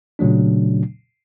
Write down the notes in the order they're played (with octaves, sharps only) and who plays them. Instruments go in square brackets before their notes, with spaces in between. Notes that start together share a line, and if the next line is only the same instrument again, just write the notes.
[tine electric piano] A#2 C#3 F#3 A3 D4